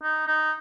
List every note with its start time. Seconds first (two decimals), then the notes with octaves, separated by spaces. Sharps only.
0.02 D#4
0.27 D#4